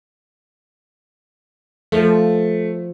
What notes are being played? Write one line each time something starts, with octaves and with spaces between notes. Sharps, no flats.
F3 A3